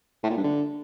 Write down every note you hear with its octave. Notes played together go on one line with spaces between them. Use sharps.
A2
A#2
G2
D3